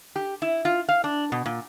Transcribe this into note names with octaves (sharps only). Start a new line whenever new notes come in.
G4
E4
F4
F5
D4
B2
A#2